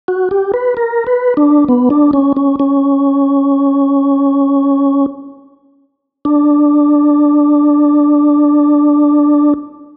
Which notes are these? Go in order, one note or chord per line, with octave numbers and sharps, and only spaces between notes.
F#4
G4
B4
A#4
B4
D4
B3
D4
C#4
C#4
C#4
D4